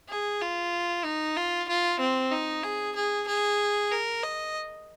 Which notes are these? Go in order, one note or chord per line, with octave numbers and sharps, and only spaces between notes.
G#4
F4
D#4
F4
F4
C4
D#4
G#4
G#4
G#4
A#4
D#5